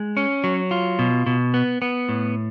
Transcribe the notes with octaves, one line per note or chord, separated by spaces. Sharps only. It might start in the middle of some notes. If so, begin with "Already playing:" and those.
Already playing: G#3
C#4
F#3
F4
B2
B2
B3
B3
A2